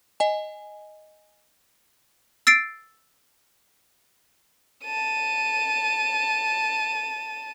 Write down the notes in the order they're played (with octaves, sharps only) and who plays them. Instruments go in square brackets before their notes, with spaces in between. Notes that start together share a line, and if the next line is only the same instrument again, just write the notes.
[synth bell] D#5 G#5
[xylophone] E6 A6 C7 D7
[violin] A5 D#7